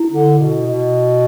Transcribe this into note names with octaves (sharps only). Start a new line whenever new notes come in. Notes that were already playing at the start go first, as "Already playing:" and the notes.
Already playing: E4
D3
B2
B2